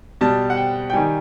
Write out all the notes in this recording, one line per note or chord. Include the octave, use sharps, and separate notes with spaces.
B2 G3 A5
F#5
G5
G5
D#3 G3 G#5